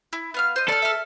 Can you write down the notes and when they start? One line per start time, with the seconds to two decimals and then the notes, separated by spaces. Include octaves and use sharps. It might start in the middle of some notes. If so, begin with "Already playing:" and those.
0.13 E4
0.34 B3 F5 F6
0.56 C5 D#5
0.68 A4 D5 F6
0.82 E5 F6